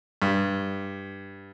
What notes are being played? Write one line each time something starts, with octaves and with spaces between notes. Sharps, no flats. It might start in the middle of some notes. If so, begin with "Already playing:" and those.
G2